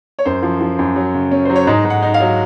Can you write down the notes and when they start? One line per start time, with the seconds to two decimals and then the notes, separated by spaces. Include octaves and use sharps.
0.19 C#5
0.25 F#2 C5
0.43 F3
0.61 F3
0.79 F#2
0.96 F#3
1.14 C#3
1.31 C#4
1.45 F#3 C5
1.56 C#5
1.67 G#2 D#5
1.85 G#2
1.90 F#5
2.02 D#4
2.14 F5
2.20 F#3